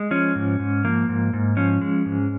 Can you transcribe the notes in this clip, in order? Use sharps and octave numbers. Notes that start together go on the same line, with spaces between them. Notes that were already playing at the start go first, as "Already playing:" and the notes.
Already playing: G#3
F3 C#4
G#2
G#2
F3 A#3
G#2
G#2
F3 C#4
G#3
G#2